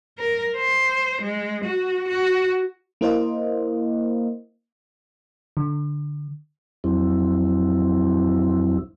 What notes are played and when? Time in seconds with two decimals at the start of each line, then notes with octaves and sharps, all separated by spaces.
0.19 A#4
0.58 C5
1.22 G#3
1.64 F#4
2.08 F#4
3.01 A#3 E4 A#4 C5 D#5 F5
5.57 D3
6.84 F2 F#3 C4 E4